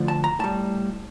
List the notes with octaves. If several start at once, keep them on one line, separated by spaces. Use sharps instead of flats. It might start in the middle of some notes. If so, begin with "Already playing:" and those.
Already playing: D2 D3 F3 A3
A5
A#5
A2 G3 A5